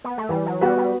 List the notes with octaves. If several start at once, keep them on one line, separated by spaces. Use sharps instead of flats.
B3
A3
E3 G3
F#3
G3 B3 F#4 B4
G3